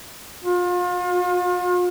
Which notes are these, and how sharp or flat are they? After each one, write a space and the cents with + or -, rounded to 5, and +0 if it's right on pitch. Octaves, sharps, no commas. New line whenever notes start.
F4 +40